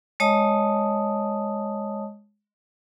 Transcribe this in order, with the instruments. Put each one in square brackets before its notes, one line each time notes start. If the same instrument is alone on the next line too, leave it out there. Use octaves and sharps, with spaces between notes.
[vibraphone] G#3 C#5 D#5 A5 D#6